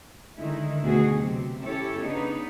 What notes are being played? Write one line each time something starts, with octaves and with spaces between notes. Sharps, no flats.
D3 D#3 G#3 E4
D2 B2 F#4 G#4
C3 F#3 C4
C#4 E4 G4 A4 C#5
C#3 B3 D4 D#4